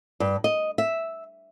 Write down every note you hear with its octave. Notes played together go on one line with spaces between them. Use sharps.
G2
D#5
E5